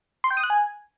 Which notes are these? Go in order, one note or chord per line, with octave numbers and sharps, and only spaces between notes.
C6
G5
D#6
F#6
G#5